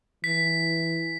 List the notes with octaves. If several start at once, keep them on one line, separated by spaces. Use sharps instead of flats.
E3 B6